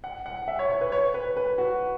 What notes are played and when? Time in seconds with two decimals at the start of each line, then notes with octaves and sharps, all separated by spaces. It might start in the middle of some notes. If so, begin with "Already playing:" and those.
0.04 F#5
0.26 F#5
0.48 E5
0.59 C#5
0.70 C#5
0.81 B4
0.92 C#5
1.14 B4
1.37 B4
1.58 F#4